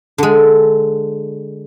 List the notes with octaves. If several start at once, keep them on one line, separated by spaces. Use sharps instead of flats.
D3 G#3